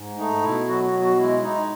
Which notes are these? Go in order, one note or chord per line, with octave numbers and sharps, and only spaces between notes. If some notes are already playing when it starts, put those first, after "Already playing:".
Already playing: G#2
A3 D#4
B2 E4
F#3 F#4
F#4
B2
F#4
G#3 E4
G#3 D#4